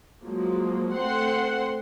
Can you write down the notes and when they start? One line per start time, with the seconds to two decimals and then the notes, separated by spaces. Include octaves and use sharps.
0.23 F3 F#3 G#3 A#3
0.95 A3 C4 C5 F#5 C6